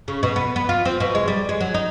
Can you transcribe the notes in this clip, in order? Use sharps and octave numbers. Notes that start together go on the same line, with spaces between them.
C#3
B2
B3
B3
F4
C4
B2
G#3
G3
G#3
F#3
D#4